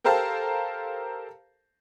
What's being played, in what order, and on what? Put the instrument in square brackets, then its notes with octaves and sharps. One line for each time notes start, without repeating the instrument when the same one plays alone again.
[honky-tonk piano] G4 A4 A#4 C5 F5 A5